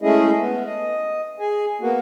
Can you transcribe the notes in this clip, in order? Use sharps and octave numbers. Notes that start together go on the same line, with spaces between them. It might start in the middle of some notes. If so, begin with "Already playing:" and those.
G#3 A3 C#4 E4 G#4 D#5
B3
D#5
G#4 G#5
A#3 B3 F#4